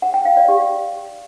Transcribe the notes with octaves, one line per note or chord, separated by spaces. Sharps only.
F#5
G5
F5
D5
G4